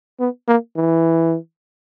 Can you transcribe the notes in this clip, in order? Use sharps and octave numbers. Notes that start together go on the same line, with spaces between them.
B3
A#3
E3